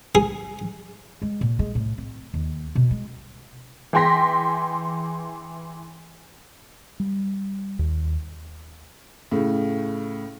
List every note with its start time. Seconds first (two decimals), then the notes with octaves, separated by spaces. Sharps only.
0.15 G#4
1.22 G#3
1.41 A#2
1.59 G#3
1.75 A2
1.98 C4
2.34 D#2
2.75 B2
2.91 G#3
3.93 E3 G#4 G5 C6 A#6 B6
7.00 G3
7.79 D#2
9.32 A2 C#3